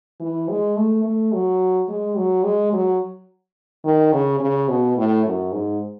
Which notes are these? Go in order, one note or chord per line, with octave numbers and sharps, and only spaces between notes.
E3
G#3
A3
A3
F#3
G#3
F#3
G#3
F#3
D#3
C#3
C#3
B2
A2
F#2
G#2